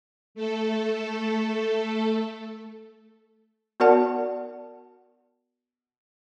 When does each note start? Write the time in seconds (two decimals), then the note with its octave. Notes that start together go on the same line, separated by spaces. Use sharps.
0.35 A3 A4
3.80 B3 F#4 A#4 D5 F#5 A5